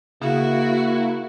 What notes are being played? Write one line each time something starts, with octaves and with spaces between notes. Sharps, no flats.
C#3 A#3 E4 F#4